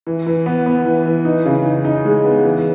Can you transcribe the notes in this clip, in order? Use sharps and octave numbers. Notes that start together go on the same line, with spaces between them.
E3
E3
B3
B3
E3
E3
D#4
C#3
D#4
D#4
G#3
B3
E3